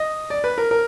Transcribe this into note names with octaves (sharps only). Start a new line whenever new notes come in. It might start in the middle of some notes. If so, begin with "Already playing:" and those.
Already playing: D#5
D5
B4
A#4
A#4